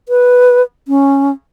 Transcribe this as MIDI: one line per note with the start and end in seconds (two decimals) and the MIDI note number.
0.09 0.62 71
0.88 1.31 61